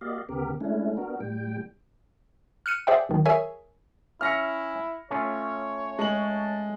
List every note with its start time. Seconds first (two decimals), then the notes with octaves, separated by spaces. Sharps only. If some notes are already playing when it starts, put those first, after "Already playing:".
0.01 A#3 F#4 G4 D5 D#5 F5
0.29 D2 C#3 B3 G4 A#4
0.61 G#3 A3 C#4 D4 E4
0.97 B3 D4 F#4 A#4
1.20 A2 G3 G5
2.66 F6 F#6 C#7 D#7
2.87 G#4 C5 D5 E5 F#5 G5
3.09 D#2 D#3 F#3
3.26 G#4 A#4 C#5 E5 G#5
4.21 C#4 E4 E5 F6 A#6 C#7
5.11 A3 C#4 F4 C#5
5.99 G#3 A5 F#7